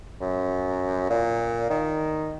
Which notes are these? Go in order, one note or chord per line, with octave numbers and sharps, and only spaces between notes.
F#2
A#2
D#3